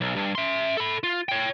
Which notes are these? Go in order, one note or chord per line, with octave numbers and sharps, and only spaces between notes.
B1
G2
E5 C6
A4 B5
F4
C#5 G5